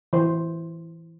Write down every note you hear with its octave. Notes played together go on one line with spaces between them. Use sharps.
E3 C5